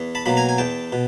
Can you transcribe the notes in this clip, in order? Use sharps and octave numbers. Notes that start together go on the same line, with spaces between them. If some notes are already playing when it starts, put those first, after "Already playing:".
Already playing: E2
A5 B5
B2 F#3 A#3 B5
G#5 A#5
G#5
E2 G5 A5
B2